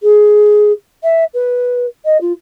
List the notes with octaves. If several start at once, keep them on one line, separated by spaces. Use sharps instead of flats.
G#4
E5
B4
D#5
F4